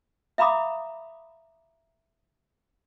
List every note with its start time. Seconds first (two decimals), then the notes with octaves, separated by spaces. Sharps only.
0.38 E5 F5 A#5 B5 D6 D#6